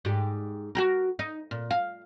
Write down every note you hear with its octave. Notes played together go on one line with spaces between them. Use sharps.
G#2 G4
F#4 G4 A#4
D#4
A#2
F5